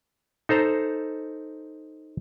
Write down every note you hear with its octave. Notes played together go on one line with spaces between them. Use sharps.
D#4 A4 C5 A#5